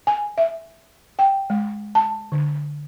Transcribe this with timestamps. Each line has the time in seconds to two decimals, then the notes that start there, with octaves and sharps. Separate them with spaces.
0.07 G#5
0.38 E5
1.19 G5
1.50 G#3
1.95 A5
2.32 D3